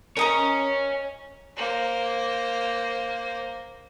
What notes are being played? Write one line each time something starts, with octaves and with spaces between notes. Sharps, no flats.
A#4 C#5 D#5 G#5 A#5
A#3 C5